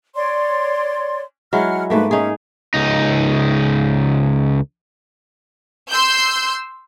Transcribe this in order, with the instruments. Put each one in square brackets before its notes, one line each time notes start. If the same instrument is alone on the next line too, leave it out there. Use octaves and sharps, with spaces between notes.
[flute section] C#5 D5 C6
[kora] F#3 G#3 E4 [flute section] F#5 F6
[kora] G#2 A3 A#3 [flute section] B4
[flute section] C#4 E5 [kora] D#4 G#4
[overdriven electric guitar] C#2 D#4
[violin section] C6 E6 G6